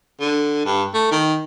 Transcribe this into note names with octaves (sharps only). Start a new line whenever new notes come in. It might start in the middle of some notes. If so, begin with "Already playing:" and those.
D3
G2
A3
D#3